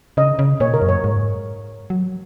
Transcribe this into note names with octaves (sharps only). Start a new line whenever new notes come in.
C#3 D#5
C#3
A#2 C#5
A#4
F#2
C#5
G#2
F#3